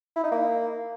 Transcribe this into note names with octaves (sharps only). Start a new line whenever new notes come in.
E4
D#4
A#3